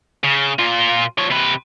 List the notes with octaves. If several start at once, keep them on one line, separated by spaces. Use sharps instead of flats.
C#3
A#2 F4
F3 C#5
C3 B4